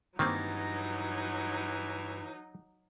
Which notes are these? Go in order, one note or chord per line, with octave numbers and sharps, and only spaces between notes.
G2 D#3 E3 F#3 A#3 C4 D#4